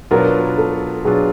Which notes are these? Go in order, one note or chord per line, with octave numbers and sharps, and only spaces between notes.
B2 F#3 B3 D4 F4 A#4
A4
B2 F#3 B3 D4 F4 G#4